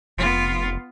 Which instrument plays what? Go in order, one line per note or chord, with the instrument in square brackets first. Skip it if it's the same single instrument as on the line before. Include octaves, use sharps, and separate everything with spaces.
[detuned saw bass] F1 [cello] B3 F4